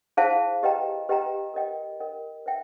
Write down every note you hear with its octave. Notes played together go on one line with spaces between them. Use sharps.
E4 G#4 C5 F5 A5
G4 B4 D#5 G5 A#5
G4 B4 D#5 G5 A#5
A#4 D#5 G5
A#4 D#5 G5
B4 E5 G5